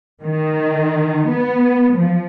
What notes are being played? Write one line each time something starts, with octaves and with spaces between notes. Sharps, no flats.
D#3
B3
F3